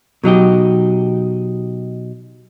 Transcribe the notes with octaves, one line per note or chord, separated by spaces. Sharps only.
B2 F#3 D#4 G4